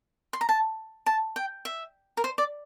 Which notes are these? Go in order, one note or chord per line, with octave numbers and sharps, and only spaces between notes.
C6
A#5
A5
A5
G5
E5
A#4
C5
D5